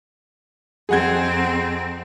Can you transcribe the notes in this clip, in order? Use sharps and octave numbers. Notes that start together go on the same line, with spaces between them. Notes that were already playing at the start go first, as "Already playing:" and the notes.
F2 C4 G#4 F#5 G#6